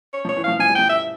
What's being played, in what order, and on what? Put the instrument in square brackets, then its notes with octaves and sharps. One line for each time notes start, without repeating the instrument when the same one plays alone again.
[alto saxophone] C#5
[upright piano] F3 [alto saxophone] C#5
[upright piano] E3
[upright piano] F3 [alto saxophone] F5
[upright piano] F3 [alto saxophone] G#5
[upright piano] G3
[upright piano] F3 [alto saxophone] G5
[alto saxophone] E5